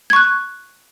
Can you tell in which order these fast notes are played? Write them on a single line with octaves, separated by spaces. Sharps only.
G#6 C#6 F#6